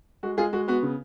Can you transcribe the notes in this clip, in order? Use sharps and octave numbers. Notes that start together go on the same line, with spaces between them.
G#3 F#4
G#3 F4 G#4
G#3 F#4
B3 F#4
C#3